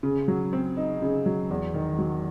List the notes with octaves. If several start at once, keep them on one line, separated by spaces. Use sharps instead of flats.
C#3
F#3
C4
D#4
C#3
F#3
E2
D#3
F#3